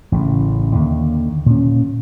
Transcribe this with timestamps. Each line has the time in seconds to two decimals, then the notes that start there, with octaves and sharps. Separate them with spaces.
0.12 A1 A2 C#3
0.75 D#2 D3
1.46 A#2 C#4